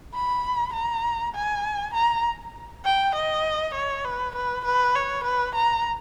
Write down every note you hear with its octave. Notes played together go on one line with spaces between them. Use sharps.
B5
A#5
G#5
A#5
G5
D#5
C#5
B4
B4
B4
C#5
B4
A#5